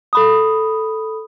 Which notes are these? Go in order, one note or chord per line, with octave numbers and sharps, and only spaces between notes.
A4 B5 D#6